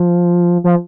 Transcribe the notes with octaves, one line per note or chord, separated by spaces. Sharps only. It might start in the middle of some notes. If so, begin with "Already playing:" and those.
Already playing: F3
F3